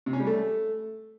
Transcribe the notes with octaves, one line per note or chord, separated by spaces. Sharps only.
C3
C#4
G3
A3